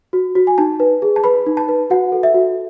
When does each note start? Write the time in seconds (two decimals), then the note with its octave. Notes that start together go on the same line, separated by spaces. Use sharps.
0.13 F#4
0.35 F#4
0.47 G#5
0.58 D#4 A5
0.80 B4
1.02 G#4
1.16 A5
1.24 B4 B5
1.46 D#4
1.57 A5
1.68 B4
1.90 F#4 F#5
2.12 A4
2.23 E5
2.34 F#4